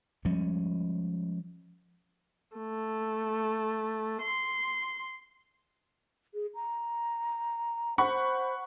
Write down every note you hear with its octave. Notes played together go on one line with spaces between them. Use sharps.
F3 G3 G#3 C#4
A3
C6
G#4
A#5
C5 F#5 B5 C#6